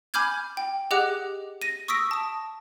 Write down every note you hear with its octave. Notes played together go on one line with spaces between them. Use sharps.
G#5 B5 D6 F6 G6 G#6
G5
G4 G#4 D#5 F#5 D6 F#6
A#6 D#7
C#6 D#6 E6 A#6 B6 D7
A5 D#6